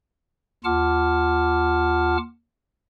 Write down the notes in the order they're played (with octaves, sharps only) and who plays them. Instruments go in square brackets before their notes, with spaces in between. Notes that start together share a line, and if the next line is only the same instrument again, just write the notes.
[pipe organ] D#2 F4 F#5 A5 D6 F6